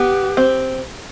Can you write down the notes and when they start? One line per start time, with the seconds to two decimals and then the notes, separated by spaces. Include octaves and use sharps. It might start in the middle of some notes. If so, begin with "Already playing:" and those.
Already playing: B3 G4
0.37 C4